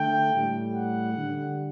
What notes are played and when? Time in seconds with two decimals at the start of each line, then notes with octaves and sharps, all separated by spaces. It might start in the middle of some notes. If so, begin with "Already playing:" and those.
Already playing: D3 A3 G5
0.35 A2 G3
0.74 F#5
1.14 D3 G3